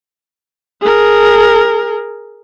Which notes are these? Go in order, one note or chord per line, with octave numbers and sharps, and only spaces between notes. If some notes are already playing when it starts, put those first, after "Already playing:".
G#4 A#4